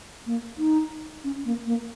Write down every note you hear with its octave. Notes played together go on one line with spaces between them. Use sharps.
A#3
D#4
C#4
A#3
A#3